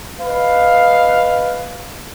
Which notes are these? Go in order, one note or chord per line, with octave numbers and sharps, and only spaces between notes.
B4 D#5 F5